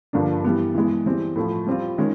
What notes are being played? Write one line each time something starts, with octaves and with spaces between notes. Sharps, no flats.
G2 D3 F3 A#3 D4
E3 G3 B3
E3 G#3 B3
E3 G3 C4
A2 F3 A3
G3 C4 F4
D#3 G#3 C#4